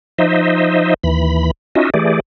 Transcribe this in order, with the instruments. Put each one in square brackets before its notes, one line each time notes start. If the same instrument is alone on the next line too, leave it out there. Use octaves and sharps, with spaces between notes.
[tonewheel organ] F3 D#4 C5 D#5 E5
D#2 E3 B5
C#4 D#4 F4 F#4 D#5 E5
E3 A3 G4 G#4 D5